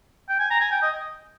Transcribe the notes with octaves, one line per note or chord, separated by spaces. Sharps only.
G5
G#5
A#5
G#5
G5
D#5